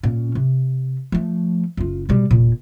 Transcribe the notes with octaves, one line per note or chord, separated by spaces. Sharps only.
A#2 C#4
C3
F3 A3
F#1 F4
B2 G3
E1 A#2